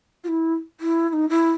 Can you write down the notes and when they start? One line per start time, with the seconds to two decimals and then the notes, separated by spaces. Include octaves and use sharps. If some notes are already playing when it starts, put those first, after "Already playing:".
0.24 F4
0.28 E4
0.80 E4
1.09 E4
1.13 D#4
1.29 E4